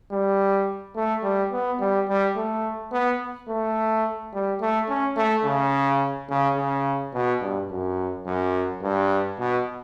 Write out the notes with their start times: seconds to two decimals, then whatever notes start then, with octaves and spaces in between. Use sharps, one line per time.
0.12 G3
0.95 A3
1.23 G3
1.52 B3
1.80 G3
2.08 G3
2.36 A3
2.92 B3
3.48 A3
4.33 G3
4.61 A3
4.89 C#4
5.17 A3
5.45 C#3
6.30 C#3
6.57 C#3
7.14 B2
7.41 G2
7.71 F#2
8.26 F#2
8.83 G2
9.39 B2